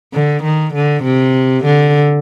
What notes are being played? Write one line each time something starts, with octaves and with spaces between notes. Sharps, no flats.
D3
D#3
D3
C3
D3